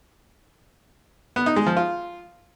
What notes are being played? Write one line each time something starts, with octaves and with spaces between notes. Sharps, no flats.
B3
D#4
G#3
F3
F4